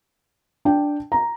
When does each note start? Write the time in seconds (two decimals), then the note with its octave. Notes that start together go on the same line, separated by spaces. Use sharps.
0.65 D4 G5
1.12 A#5